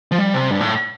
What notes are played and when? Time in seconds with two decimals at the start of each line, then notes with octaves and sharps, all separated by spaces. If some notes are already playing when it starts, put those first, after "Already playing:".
0.12 F3
0.18 G3
0.34 C3
0.50 G2
0.61 A2